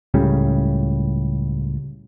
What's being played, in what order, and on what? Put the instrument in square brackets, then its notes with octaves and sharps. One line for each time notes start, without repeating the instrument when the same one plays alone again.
[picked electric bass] C#2 A2 C#3 G3